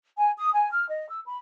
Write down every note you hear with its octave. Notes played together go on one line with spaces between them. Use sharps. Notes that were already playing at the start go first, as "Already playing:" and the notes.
G#5
D#6
G#5
F6
D#5
E6
B5